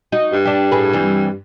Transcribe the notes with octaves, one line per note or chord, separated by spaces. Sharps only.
D#4 F#4
G2
D4 G4
A2 G#4 B4
E3 G3 C4